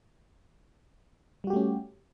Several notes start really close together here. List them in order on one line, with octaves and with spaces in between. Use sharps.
G3 F#4 G4 A3 C#4